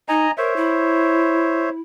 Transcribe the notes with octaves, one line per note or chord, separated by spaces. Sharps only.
D#4 D#5 G#5 A#5
A#4 C5 C#5 E5
E4